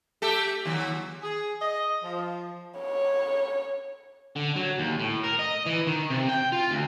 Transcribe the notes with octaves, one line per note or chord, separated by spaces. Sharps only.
A3 G4 A4
D#2 F#3
G#4
D#5
F3
C#5
D3
F#3
D#2
A2
A#4
D#5
E3
D#3
C3
G5
F4
D2